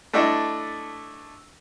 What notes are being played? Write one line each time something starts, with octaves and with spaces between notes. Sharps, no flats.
A3 D4 E4 A4 D#5